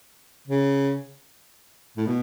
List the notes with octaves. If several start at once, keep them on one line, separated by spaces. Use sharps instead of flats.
C#3
A2
B2